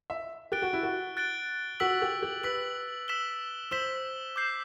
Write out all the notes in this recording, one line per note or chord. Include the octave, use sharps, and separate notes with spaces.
E5
G4 F#6 A6 D7 G7
F#4
E4
F#4
F#6 A6 D7 G7
F#4 E6 B6 F#7
G4
G4
B4 E6 B6 F#7
E6 B6 E7 G7
C5 E6 B6 E7 G7
D6 G6 C7